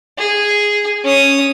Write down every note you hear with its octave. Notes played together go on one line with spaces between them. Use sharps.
G#4
C#4 D#6